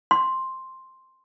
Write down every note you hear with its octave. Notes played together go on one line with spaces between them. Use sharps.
C6